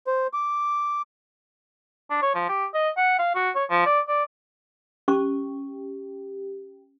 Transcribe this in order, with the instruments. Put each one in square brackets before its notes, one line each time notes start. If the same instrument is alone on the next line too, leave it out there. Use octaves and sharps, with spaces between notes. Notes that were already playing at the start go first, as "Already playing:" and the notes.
[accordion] C5
D6
[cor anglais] D4
C#5
F3
G4
D#5
F#5
F5
F#4
C#5
F3
D5
D5
[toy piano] C#4 C#6 [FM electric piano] G4